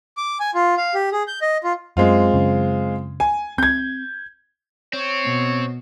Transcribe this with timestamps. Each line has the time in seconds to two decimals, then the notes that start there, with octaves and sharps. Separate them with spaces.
0.17 D6
0.40 G#5
0.55 F4
0.77 F5
0.94 G4
1.12 G#4
1.28 G6
1.42 D#5
1.64 F4
1.97 F#2 G#3 C4 F4
2.34 F#2 C#3
3.20 G#5
3.58 C4 G6 G#6
4.93 C4 C#5
5.27 B2